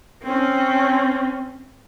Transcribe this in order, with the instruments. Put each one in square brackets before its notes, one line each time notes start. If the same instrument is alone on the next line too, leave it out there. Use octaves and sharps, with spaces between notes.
[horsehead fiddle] C4 C#4